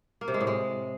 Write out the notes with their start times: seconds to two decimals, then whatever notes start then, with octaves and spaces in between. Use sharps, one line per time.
0.21 A#3
0.28 C3
0.34 G#3
0.41 A2
0.47 G#3